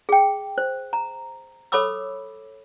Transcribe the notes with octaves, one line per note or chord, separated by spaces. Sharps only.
G#4 G5
C5
A#5
A4 C#5 B5 D6 E6